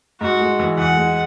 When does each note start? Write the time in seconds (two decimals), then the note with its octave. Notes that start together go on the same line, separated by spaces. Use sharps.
0.21 G#2 F#4
0.40 G#3
0.60 E3
0.78 E2 F#5
0.96 G#3